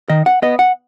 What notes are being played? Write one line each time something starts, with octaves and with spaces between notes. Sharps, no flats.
D#3 D#5
F#5
B3 D#5
F#5